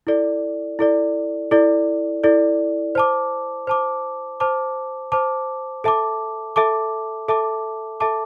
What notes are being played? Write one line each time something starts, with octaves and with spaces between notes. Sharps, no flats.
E4 A4 D5
E4 A4 D5
E4 A4 D5
E4 A4 D5
C5 A5 D6
C5 A5 D6
C5 A5 D6
C5 A5 D6
A4 E5 A5 D6
A4 E5 A5 D6
A4 E5 A5 D6
A4 E5 A5 D6